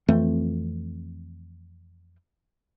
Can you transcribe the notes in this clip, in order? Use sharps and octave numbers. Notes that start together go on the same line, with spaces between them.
F2 E3 A3 C4